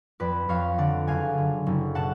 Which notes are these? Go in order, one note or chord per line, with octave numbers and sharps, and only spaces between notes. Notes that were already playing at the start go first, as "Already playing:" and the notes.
F2 B4 D5
F2 C#5 F5
D3 D5 F#5
F#1 F5 G#5
D3
F#1
B2 F#5 A5